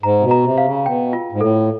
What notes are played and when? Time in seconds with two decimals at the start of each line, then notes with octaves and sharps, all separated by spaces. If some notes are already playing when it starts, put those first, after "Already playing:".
0.03 G#2 A#5
0.19 C3
0.23 B2
0.31 A#5
0.44 C3
0.58 F5
0.65 C#3
0.85 B2 G5
1.13 F4
1.32 G#2
1.40 A2 A4